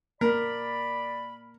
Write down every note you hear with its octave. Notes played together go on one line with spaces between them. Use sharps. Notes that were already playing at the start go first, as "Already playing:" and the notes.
A#3 A#4 D5 B5